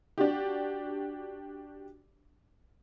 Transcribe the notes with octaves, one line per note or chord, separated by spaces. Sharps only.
D4 F#4 G4